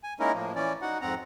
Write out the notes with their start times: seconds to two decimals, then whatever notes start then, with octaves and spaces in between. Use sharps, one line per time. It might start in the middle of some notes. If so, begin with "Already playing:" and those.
0.04 G#5
0.20 G#3 A#3 C#4 D#4 E4 A#4
0.34 A2 F3 A#3
0.56 E3 C#4 D5
0.82 D#4 F#4 F#5
1.01 F2 G#2 C4 F#5 A#5